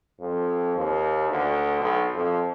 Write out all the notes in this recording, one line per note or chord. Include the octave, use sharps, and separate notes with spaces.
F2
D#2
D2
B1
F2